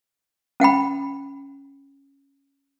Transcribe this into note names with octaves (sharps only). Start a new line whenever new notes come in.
C#4 F#5 G5 B5